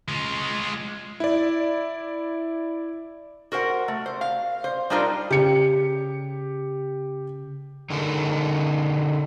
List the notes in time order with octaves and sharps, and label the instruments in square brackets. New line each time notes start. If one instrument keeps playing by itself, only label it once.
[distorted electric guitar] G#3 F4
[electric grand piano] E4 D5
[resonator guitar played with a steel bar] F#4 A#4 C5 F#5
A3
C5
F5
C5
G3 D4 D#4 F4 A#4 C5
[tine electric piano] C#3 [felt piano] G4 C#7
[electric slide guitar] D3 D#4 G#4 A#4